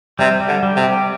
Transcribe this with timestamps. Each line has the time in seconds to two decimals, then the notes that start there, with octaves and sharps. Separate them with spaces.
0.19 C3 G3
0.40 G3
0.48 D3
0.63 G3
0.77 C3
0.84 G4